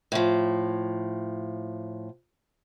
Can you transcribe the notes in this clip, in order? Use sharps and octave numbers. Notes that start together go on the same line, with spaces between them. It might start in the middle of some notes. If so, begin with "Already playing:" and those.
A2 F3